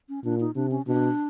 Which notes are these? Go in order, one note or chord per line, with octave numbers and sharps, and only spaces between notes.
C#4
A#2 D4
D#4
C3 D4
C#4
B2 D4